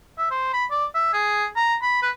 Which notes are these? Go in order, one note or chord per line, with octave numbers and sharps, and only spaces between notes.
E5
C5
B5
D5
E5
G#4
A#5
B5
B4